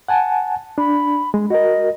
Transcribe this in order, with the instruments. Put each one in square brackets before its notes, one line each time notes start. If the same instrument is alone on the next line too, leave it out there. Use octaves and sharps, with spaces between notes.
[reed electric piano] F#5 G#5 A5
[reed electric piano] D4 [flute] B5
[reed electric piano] G#3
[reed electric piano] F#4 A#4 [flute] D#5